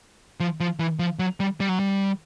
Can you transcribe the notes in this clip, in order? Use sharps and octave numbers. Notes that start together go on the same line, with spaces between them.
F3
F3
E3
F3
F#3
G3
G3
F#3
G3